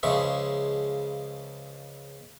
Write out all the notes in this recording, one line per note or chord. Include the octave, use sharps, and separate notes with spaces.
C#2 C#3 F3 G#3 E5 C#6